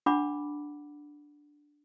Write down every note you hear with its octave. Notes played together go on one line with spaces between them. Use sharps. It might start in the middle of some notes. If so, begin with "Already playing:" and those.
D4 F#5 B5 D6